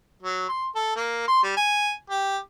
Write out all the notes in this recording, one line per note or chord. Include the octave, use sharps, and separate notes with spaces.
F#3
C6
A4
A#3
C6
G3
G#5
G4